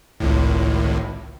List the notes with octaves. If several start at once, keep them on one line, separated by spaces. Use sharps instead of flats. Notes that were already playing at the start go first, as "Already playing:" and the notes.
G#1 C#2 A2